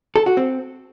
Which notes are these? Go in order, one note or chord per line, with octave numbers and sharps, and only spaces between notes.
A4
F#4
C4